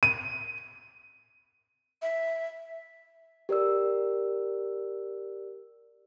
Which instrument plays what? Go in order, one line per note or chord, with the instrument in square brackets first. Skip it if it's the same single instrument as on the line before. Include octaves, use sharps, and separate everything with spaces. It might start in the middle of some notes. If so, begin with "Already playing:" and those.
[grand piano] D#7
[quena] E5
[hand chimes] G4 A#4 D5 E6